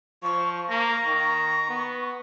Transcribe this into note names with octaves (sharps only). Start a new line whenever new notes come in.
F3 C#6
A#3 A#5 C#6
D#3
B3